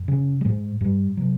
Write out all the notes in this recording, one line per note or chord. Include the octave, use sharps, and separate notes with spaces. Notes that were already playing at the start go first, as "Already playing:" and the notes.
Already playing: F#2
C#3 C#4
G3
G#2 G#3
G2 G3
C3 F#3